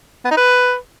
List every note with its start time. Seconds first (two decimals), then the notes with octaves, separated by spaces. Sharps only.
0.25 B3
0.31 D#4
0.37 B4